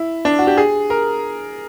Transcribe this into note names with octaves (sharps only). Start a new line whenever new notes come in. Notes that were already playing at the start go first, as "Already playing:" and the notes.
Already playing: E4
D4
F#4
G4
G#4
A#4